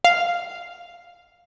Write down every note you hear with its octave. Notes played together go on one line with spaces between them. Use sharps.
F5